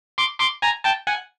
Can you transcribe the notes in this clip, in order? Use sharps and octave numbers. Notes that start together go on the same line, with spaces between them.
C6 D6
C6 D6
G#5 A#5
G5 A5
F#5 G#5